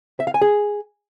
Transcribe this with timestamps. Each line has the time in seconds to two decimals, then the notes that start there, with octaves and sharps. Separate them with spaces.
0.20 E5
0.27 F5
0.34 G#5
0.42 G#4